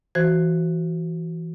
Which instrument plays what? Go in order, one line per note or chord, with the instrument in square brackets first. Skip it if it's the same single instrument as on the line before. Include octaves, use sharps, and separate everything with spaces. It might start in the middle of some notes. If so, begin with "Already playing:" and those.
[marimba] E3 F#4 C5 G#6